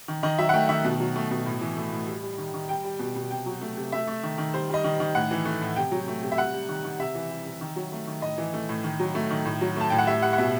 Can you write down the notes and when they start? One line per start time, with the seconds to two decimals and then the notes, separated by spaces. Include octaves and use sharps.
0.08 D#3
0.23 D#3 D#5
0.38 F#3 E5
0.49 F#5
0.54 A3 G5
0.69 D#3 E5
0.84 B2
1.00 F#3
1.16 A3
1.31 B2
1.46 A2
1.61 E3
1.77 A3
1.92 A2
2.08 G3
2.23 G3
2.38 D#3
2.54 D#3
2.69 G3 G5
2.84 G3
2.99 B2
3.16 B2
3.31 C3 G5
3.46 F#3
3.61 A3
3.77 C3
3.92 A3 E5
4.07 A3
4.23 D#3
4.38 D#3
4.54 G3 C5
4.69 G3 D#5
4.84 D#3
5.00 D#3
5.15 A2 F#5
5.31 E3
5.45 A3
5.62 A2
5.76 C3 G5
5.92 F#3
6.08 A3
6.23 C3
6.32 E5
6.38 G3 F#5
6.54 G3
6.69 D#3
6.85 D#3
6.99 C3 E5
7.15 E3
7.31 G3
7.46 C3
7.61 D#3
7.76 F#3
7.92 A3
8.07 D#3
8.22 A2 D#5
8.38 E3
8.54 A3
8.69 A2
8.84 D#3
8.99 F#3
9.15 A3
9.31 D#3
9.45 A2
9.61 F#3
9.76 A3 A5
9.90 A2 G5
9.98 F#5
10.07 G3 E5
10.22 G3 F#5
10.33 F#5
10.38 B2 E5